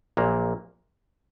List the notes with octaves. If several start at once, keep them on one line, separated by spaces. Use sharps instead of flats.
A#1 A#2 F#3 A#3